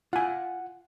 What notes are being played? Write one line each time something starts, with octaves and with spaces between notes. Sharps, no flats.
F4 F#5 G#5